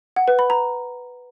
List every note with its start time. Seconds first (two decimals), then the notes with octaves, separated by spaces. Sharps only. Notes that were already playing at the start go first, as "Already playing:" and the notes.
0.16 F#5
0.28 B4
0.39 B5
0.50 A#5